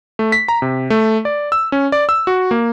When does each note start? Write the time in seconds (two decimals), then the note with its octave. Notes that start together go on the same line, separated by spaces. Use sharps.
0.19 A3
0.32 B6
0.48 A#5
0.62 C3
0.90 A3
1.25 D5
1.52 E6
1.72 C#4
1.92 D5
2.09 E6
2.27 F#4
2.51 A#3